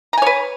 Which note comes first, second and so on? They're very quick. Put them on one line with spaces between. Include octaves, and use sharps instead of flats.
A#5 G#5 C#5 B4